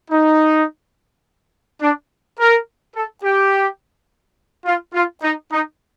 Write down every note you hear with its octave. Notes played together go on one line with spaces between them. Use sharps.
D#4
D4
A#4
A4
G4
F4
F4
D#4
D#4